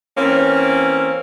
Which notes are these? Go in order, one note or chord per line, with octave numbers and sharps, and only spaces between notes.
E3 A#3 C4 C#4